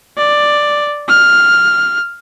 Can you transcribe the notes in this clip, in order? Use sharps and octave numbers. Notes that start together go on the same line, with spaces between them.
D5
F6